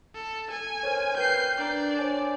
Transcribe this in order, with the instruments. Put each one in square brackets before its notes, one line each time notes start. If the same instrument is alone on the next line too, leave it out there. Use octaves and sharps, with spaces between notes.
[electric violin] A4
[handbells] A4 [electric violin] G#5
[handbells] A#4 C5 C#5
[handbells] A#4 B4 G5 [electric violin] G6 C7
[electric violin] D4 D5 [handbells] A#5 D6
[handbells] C5 C#5 G#5